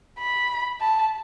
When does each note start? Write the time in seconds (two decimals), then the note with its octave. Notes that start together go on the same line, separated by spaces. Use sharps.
0.19 B5
0.80 A5